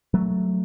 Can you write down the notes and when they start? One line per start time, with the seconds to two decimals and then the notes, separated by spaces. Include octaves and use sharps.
0.14 F#3 A3